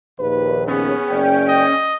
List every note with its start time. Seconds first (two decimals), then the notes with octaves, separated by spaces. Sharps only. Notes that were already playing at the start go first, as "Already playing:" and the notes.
0.19 A#1 D#2 B4
0.68 B3 C#4 G#4
1.10 F#1 D5 G5
1.49 D#5